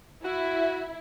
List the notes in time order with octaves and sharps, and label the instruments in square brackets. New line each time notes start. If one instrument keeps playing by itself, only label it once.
[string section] E4 [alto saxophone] F#4